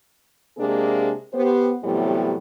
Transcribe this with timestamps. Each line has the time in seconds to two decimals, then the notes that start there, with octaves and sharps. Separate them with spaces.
0.58 C3 G#3 A#3 D4 G#4
1.34 B3 G4 C5
1.83 A2 C3 E3 F#3 G3 B3